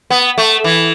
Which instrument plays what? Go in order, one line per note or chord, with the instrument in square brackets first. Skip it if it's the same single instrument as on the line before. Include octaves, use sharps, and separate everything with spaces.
[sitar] B3
A3
E3